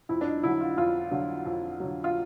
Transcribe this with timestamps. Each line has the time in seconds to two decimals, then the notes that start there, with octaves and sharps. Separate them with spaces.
0.09 F2 E4
0.21 D4
0.27 D#4
0.43 D3 F#3 E4
0.61 F4
0.77 F2 F4
1.11 D3 F#3
1.45 F2
1.80 D3 F#3
2.04 F4